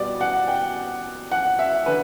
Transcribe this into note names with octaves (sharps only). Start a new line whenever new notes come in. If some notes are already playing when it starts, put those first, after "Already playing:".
Already playing: B2 G3 B3 D5
F#5
G5
F#5
E5
D3 B4